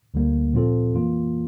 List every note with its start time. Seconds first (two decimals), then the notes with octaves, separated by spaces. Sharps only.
0.14 D2 D3 G3 A#3
0.53 A#2 F3 C4 F4 A4
0.94 F2 E3 A#3 F4